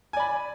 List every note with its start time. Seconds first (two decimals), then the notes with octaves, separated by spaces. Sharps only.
0.13 G#5
0.17 D5
0.20 B5